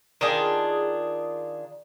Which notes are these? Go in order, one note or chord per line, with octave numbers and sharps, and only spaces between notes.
D#3 D4 F4 G#4